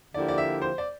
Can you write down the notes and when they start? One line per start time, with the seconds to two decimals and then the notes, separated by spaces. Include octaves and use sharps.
0.14 D3 F3 A#3 E4 G4 D5
0.28 D5
0.38 E5
0.62 C5
0.78 D5